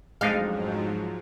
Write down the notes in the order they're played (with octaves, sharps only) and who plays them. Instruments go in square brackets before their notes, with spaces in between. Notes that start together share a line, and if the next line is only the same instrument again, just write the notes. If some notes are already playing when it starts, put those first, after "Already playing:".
[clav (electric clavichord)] F2 D4 D#4 [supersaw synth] G#2 F3 F#3 [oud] G#3 [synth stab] F5